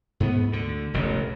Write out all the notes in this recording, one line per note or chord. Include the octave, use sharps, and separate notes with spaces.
G#2 B3
D2 D3
E1 A1 E2 C#3